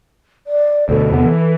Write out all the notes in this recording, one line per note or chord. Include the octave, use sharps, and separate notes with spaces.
D5
D2 B2 A4
E2 C3 B3
E3